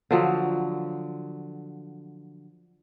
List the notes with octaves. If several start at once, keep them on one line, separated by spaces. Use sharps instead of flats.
D3 F3 F#3